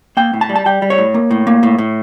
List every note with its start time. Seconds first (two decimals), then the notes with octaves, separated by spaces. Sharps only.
0.17 A#3 G5
0.34 A2
0.41 A5
0.49 G3
0.56 A5
0.66 G3 G5
0.82 G3
0.90 C#5
0.98 A2
1.14 A#3
1.31 A2
1.47 A#3
1.63 A2
1.78 A2